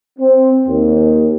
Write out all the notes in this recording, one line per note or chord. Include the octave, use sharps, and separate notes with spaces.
C4
D#2